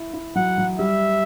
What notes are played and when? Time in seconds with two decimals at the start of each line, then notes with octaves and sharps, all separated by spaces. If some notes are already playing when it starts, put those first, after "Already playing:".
Already playing: E4
0.13 E4
0.35 F#3 F#5
0.58 F#3
0.79 G3 E5